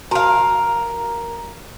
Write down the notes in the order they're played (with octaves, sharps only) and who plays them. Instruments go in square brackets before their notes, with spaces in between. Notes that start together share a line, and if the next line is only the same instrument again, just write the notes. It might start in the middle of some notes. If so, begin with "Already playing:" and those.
[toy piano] F#4 A5 A#5 [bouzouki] A#4 F5